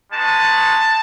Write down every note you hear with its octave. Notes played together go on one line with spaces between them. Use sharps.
G#3 B3 D#4 F#4 A5